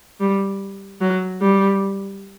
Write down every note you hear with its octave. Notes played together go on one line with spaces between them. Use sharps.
G3
F#3
G3